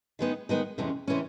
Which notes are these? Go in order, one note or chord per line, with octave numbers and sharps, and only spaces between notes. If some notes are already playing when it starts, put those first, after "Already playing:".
D#3 G#3 B3 D#4
D#3 G#3 B3 D#4
F2 C3 E3 G#3 C#4
C3 E3 G#3 C#4